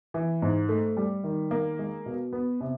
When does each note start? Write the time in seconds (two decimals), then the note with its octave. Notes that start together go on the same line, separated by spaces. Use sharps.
0.14 E3
0.42 G#2
0.69 A3
0.97 G3
1.24 D#3
1.51 A#3
1.79 G#3
2.06 B2
2.33 B3
2.61 C3